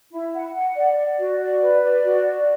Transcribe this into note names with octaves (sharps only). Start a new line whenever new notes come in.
E4
F#5
F#5
D5
D5
F#4
D5
B4
D5
F#4
D5